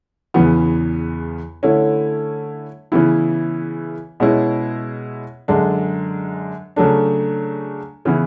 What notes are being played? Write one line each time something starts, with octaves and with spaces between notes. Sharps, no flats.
E2 C#3 E3 B3
D3 A3 C#4 E4
C#3 E3 B3 E4
B2 G#3 C#4 E4
F#2 D3 G#3 D4
C#3 F#3 A3 D4
C#3 E3 B3 E4